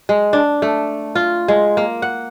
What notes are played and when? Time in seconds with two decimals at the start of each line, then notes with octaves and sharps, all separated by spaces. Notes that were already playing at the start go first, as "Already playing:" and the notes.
0.09 G#3
0.33 D4
0.62 A3
1.15 F4
1.48 G#3
1.77 A#3
2.02 F#5